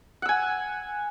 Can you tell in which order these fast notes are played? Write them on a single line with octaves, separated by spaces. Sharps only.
F#5 E6 G#5